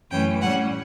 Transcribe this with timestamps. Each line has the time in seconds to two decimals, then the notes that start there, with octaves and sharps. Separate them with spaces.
0.11 F#2 E3 A3 C#4 G5
0.41 A2 G3 C#4 F#5